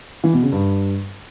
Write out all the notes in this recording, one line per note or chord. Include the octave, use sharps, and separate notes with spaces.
E3
B2
C#3
G2